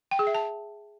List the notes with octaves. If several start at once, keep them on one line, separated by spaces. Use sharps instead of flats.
G5
G#4
E5
A5